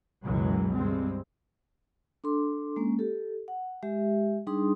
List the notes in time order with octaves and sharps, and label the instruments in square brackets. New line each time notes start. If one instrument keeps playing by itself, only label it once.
[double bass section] C#2 F#2 B2 E3 F#3 G#3
G2 G#3 C4
[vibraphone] D4 A4 C6 D6
G#3 A#3 C#4
G4 A4
F#5
G#3 G4 E5
G3 D4 D#4 G#4 C6 D#6